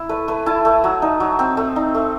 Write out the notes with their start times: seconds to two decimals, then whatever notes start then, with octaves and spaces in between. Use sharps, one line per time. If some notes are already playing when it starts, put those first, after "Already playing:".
Already playing: E4
0.09 A3 B4
0.28 A3 B4
0.46 E4 A5
0.65 A3
0.84 F#3
1.02 D#4
1.20 F#3
1.39 C4
1.57 A3
1.76 D#4
1.94 A3